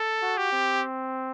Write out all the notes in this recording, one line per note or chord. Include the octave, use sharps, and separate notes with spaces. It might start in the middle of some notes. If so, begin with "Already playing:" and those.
Already playing: A4
F#4
G4
C4